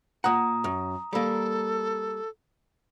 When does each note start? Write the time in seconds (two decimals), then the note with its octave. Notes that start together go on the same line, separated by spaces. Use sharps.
0.24 A#2 F#5 A#5 D#6
0.64 F#2
1.13 G3 A#3 A4